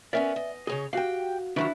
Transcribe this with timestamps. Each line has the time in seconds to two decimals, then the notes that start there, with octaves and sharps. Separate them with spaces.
0.13 B3 C#4 A#4 D5 E5
0.36 D#5
0.67 C#3 G#4 C#5 D#5
0.93 F#4 G4 F5 G5
1.56 D#3 F#3 D4 E4 F4 B4